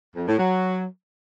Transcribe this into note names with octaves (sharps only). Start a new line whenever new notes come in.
F2
A2
F#3